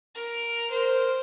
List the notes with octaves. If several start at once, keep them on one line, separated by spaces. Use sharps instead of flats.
A#4
A#4 C5